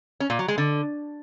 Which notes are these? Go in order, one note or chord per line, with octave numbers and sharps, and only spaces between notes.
C#4
A#2
F#3
G#3
D3